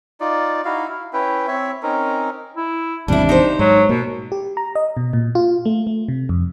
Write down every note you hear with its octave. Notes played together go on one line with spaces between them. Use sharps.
D#4 F4 D5
D#4 E4 F#4 F5
E4
C#4 E4 B4 G5
C4 C#5 E5
C4 C#4 D#4 A#4
E4
G#1 E2 C3 G3 D4 E4
D#4 G4 C5
G#2 F#3
B2 A#3
G4
A#5
D#5
B2
A#2
F4
A3
A3
C3
F2